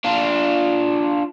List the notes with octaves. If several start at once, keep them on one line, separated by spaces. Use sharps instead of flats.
D4 F4